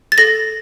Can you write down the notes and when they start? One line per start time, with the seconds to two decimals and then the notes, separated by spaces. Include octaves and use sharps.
0.12 A6
0.18 A4 A#6